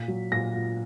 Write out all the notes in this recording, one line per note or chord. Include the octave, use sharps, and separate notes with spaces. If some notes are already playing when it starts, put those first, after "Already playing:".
Already playing: A#2 B6
F#3
A#2 A#6
A#2